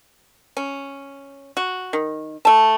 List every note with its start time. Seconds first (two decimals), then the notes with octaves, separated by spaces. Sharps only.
0.57 C#4
1.57 F#4
1.93 D#3
2.45 A3 A5